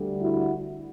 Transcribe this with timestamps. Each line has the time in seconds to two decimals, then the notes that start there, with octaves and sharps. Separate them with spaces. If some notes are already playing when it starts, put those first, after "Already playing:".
Already playing: D2 D3 G3
0.20 E4 F#4